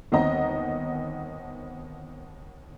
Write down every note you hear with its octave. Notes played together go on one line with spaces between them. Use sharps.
G1 D#2 B3 C4 D#5 A#5